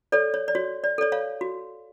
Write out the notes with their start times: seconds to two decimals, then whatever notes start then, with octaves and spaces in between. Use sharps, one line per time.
0.12 A4 C#5 D5
0.34 C#5
0.48 D5
0.55 F#4 C#5
0.84 D5
0.98 A4 C#5 D5
1.12 C#5 F5
1.41 F#4